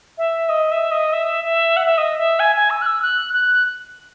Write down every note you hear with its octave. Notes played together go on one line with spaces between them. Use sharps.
E5
D#5
E5
D#5
E5
E5
F#5
E5
D#5
E5
G#5
G#5
E6
F#6
E6
F#6
F#6